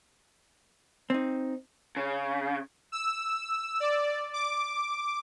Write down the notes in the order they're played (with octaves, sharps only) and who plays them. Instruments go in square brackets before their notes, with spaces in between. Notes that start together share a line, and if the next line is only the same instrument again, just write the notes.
[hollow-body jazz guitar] C4 D#4
[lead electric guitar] C#3
[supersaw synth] E6
D5
D6